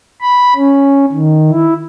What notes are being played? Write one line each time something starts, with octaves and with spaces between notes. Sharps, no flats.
B5
C#4
D#3
E4